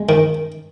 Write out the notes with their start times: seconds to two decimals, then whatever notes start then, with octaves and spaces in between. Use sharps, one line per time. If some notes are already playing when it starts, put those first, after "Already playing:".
Already playing: G#3
0.09 D#3